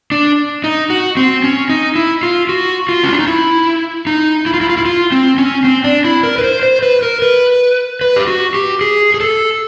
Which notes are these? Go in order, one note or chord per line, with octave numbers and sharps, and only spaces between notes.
D4
D#4
F#4
C4
C#4
D#4
E4
F4
F#4
F4
C#4
D4
D#4
E4
D#4
E4
F4
E4
F4
E4
F4
C4
C#4
C4
D4
E4
A#4
B4
C5
C5
B4
A#4
B4
B4
G4
F#4
G4
G#4
G#4
A4